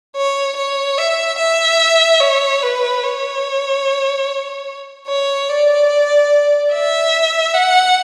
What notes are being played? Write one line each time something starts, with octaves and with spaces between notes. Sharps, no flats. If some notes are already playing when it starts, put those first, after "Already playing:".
C#5
C#5
E5
E5
C#5
B4
C#5
C#5
D5
E5
F#5